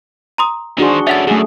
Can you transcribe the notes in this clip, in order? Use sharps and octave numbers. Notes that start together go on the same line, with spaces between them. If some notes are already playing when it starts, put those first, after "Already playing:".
A#5 C6 D#6
D#3 D4 F#4 G#4 C5
C#4 A4 E5 F#5 A6
F#2 A3 G#4